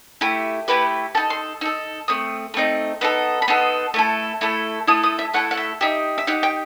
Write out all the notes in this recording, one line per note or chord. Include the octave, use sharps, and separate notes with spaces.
A3 E4 G4
A3 E4 G4 B4
D#4 A4 A5
C6
D#4 A4 E6
A3 C4 D#6
A3 C4 D#4
B3 D#4 A4
B5
B3 D#4 A4 C6
A3 E4 A4
A3 E4 A4
A3 E4 A4 D#6
D#6
E5
A3 E4 A4 F#5
F#5
E5
D#4 G4 E5
E5
D#4 G4 F#5
G5